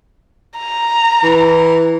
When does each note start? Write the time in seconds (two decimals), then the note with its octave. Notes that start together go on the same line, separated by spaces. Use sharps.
0.58 A#5
1.23 E3